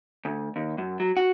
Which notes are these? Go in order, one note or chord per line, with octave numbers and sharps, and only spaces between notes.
D2
D#2
F#2
F#3
F#4